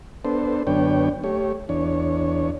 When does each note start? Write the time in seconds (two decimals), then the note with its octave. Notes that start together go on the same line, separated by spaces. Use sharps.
0.25 B3 D4 A4 C5
0.67 F#2 D3 B3 D4 C#5 G5
1.24 A3 G4 C#5
1.69 E2 D4 C#5